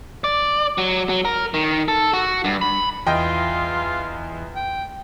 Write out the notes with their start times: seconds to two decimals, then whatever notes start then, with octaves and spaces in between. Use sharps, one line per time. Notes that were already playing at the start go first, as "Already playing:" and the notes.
0.24 D5
0.78 F#3
1.09 F#3
1.25 A#4
1.54 D#3
1.88 A4
2.13 F#4
2.44 G2
2.61 B5
3.07 E2 F4 D#5 G5
4.56 G5